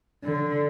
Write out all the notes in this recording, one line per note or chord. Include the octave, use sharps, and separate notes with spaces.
D3